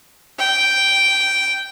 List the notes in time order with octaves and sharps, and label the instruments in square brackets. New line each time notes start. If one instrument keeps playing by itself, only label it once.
[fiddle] G5